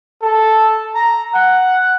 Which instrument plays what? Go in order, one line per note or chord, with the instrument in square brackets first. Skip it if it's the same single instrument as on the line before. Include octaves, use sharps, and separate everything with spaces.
[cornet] A4
A#5
F#5